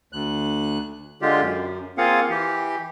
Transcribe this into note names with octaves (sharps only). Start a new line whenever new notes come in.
D2 F#6
D3 G#3 F4 G4
F#2
A#3 C4 F4 G#4 F5 F#5
E3 G4